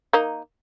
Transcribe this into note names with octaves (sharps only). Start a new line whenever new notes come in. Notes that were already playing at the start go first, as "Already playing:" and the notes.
A#3 D#4